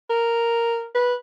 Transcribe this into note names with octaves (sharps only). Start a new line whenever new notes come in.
A#4
B4